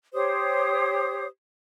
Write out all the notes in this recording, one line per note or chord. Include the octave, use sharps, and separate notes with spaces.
G4 C5 C#5 D#6